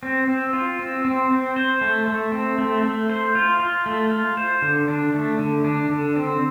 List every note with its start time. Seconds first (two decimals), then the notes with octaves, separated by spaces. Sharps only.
0.03 C4
0.28 C4
0.53 F4
0.79 C4
1.05 C4
1.31 C4
1.56 C5
1.81 A3
2.08 A3
2.32 C4
2.58 A3
2.83 A3
3.10 C5
3.35 F4
3.60 F4
3.86 A3
4.11 F4
4.37 C5
4.62 D3
4.88 D4
5.14 A3
5.39 D3
5.64 D4
5.90 D3
6.16 C4